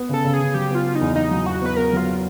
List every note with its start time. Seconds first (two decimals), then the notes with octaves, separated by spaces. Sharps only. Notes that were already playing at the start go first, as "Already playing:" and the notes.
Already playing: B3
0.09 C#3 A4
0.24 C#3
0.34 G#4
0.40 C#3
0.54 F#3 G4
0.70 B3 F4
0.85 B3
0.95 D#4
1.01 E2
1.15 E2 D#4
1.31 F#3
1.46 E2 F#4
1.61 B3 B4
1.77 B3 A#4
1.93 F#3 F4